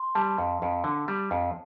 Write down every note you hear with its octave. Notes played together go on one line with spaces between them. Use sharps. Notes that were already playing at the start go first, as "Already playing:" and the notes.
Already playing: C6
G3 A5
F2
F2
D3
G3
F2